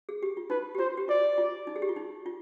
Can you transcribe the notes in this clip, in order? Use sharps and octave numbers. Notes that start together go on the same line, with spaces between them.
G#4
G4
F4
D#4 B4
G4
F4 C5
G4
F4 D5
F4
D#4
G#4
G4
F4
D#4
F4